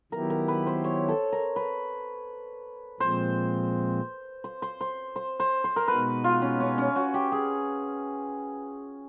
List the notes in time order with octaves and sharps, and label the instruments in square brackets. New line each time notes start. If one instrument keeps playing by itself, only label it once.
[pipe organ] D#3 F#3 B3 E4 G4 [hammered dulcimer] A#4
[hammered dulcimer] A#4
B4
C5
C#5
A4
A#4
B4
[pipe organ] A#2 F3 G#3 C4 [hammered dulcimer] C5
[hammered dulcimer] C5
C5
C5
C5
C5
C5
A#4
[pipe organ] B2 G#3 B3 D#4 F#4 [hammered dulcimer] B4
[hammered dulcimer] F4
C#4
C#4
C#4
F#4
G4
G#4